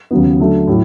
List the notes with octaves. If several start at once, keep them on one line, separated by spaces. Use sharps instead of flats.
D#2 C#3 F#3 B3
D3 F#3 A3
A2 F#3